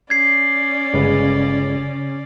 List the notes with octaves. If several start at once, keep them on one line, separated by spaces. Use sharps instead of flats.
C#4 D5 G#6 C7
G1 C#3 G#3 B4